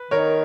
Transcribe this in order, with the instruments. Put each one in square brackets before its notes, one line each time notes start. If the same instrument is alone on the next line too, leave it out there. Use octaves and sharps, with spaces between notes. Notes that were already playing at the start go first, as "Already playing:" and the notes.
Already playing: [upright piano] B4
[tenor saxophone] D#3 [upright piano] A#4 C#5